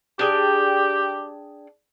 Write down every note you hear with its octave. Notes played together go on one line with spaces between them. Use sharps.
D4 G4 G#4 G5